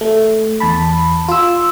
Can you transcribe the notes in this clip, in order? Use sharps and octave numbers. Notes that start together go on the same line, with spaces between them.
A3
E2 A5 B5
F4 E6